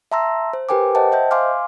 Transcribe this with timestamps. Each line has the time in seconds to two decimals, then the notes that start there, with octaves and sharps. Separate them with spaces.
0.12 E5 A5 A#5 C6 E6 A#6
0.53 C5
0.69 G4 A#4 B4 G5 G#5 D6
0.95 C5 D#5 F#5 G5 A5
1.12 C5 D#5 E5 G6
1.31 F5 G#5 C6 D6 F6